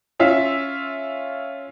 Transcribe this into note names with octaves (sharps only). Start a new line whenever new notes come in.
C#4 F4 E5